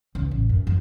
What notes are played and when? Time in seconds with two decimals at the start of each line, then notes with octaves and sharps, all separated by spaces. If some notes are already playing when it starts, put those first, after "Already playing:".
0.15 C#2
0.31 A1
0.49 F#2
0.67 F#2